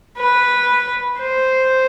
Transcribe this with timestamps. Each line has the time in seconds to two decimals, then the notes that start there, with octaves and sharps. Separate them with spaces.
0.18 B4
1.22 C5